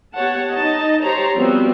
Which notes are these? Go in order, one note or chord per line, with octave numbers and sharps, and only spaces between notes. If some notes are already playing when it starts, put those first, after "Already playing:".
B3 G4 C#5 F#5 A5
D#4 D#5 A5
G4 C5 C#5 A5 A#5
F3 G3 B3 C4 F#4